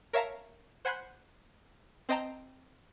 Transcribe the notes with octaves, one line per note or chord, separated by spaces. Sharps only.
A#4 C#5 E5 F5 A5 A#5
C5 F#5 G#5 B5 C6 F#6
C4 C5 D#5 G5 A5 A#5